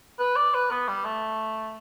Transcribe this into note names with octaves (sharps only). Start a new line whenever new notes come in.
B4
D5
B4
B3
G3
A3